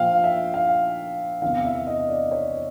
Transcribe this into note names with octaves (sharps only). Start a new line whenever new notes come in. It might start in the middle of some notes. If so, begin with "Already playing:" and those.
Already playing: A#2 F3 F5 G5
E5
F5
E2 C3 E3 F5
E5
D#5
D5
C#5